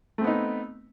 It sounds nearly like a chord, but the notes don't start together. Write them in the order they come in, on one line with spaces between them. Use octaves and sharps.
A3 C4 B3 D#4